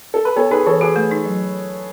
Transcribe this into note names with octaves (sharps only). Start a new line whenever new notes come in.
A4
B4
B3 A4 C#5
D#4 G#4 B4
E3 A4 C#5
F#4 G#4 B4
A3
D#4
F#3